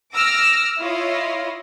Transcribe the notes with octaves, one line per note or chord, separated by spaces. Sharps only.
D6 E6 F6 A#6
E4 F4 C#5 D#5 F5